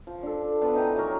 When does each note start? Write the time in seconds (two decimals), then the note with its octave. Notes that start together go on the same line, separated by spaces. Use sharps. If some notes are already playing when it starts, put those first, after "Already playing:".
0.07 F3
0.23 D4 A4
0.61 F3 B3 B4 D5
0.74 E3 D#4 G5 A#5
0.97 F#3 F#4 A#4 C#5